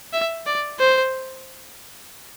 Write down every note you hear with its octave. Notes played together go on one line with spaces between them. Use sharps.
E5
D5
C5